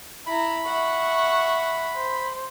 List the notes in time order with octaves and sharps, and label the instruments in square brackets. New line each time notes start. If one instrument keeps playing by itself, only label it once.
[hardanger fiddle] E4 A#5 [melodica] B5
[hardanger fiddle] E5 F#5 [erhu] C#6
[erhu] C5